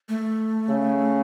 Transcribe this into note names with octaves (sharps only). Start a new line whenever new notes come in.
A3
C#3